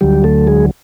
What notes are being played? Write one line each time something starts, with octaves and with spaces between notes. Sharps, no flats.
D2 D3 F#3 G3 G4
A3 A4
G#3 G#4